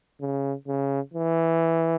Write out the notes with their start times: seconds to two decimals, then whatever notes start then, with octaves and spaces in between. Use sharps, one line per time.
0.21 C#3
0.68 C#3
1.14 E3